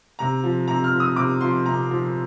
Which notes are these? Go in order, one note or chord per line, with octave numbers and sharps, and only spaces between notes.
C3 A#5
F3
C3 A#5
F6
F3
D#6
C3 D6
F3 C6
C3 A#5
F3